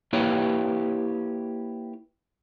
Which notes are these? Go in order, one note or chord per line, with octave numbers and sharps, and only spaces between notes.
A#3 E4 G4 B4 C#5